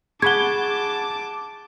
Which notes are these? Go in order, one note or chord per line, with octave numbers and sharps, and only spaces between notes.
G#4 F#5 A5 B5 C#6 D6 G#6 G7